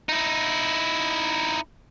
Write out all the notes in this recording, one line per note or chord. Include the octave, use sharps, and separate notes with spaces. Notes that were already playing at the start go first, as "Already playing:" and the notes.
D#4 E4